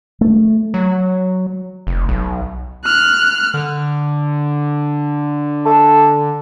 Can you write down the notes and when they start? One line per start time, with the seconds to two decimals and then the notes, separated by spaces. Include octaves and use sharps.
0.21 A3
0.74 F#3
1.87 F1
2.09 B1
2.84 F6 F#6
3.54 D3
5.66 A4